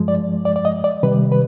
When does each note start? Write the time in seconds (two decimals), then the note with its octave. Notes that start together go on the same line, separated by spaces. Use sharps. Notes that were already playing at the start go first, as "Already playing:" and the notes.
Already playing: G2 F3 G#3
0.08 D5
0.45 D5
0.56 D5
0.65 D#5
0.84 D5
1.03 C3 D#3 G3 B4
1.32 B4